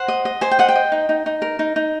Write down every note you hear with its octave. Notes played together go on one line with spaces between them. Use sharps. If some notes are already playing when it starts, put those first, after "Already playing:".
Already playing: C5 F#5
D#5
D#5
C5 G#5
G5
D#5 F#5
G5
D#5
D#4
D#4
D#4
A#4
D#4
D#4